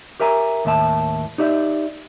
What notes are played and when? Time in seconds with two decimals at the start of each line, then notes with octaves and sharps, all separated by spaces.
0.20 G4 A#4 E5 G#5 A#5
0.65 D#2 A2 E5 A5
1.38 D#4 G4 D5 E5